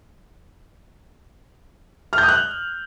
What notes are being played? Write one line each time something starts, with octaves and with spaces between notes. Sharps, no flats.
F6
G6
D#6
F#6